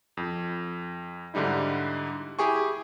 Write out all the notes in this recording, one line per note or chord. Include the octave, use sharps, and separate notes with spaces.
F2
G#2 D3 G3 D#4 E4
E4 G4 G#4 G#5 C#6